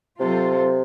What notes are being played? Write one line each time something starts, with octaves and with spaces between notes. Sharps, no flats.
C3 F#3 C4 F4 A4 C5